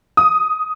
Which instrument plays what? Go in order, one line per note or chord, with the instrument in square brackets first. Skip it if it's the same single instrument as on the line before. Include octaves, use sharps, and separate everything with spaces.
[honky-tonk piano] D#6